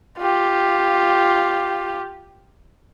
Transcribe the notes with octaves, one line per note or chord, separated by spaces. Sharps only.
F4 G4